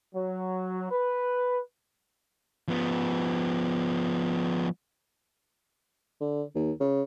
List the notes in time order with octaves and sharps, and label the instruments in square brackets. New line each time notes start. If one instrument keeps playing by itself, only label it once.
[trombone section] F#3
B4
[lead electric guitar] F3 B3
[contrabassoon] D3
D#2
C#3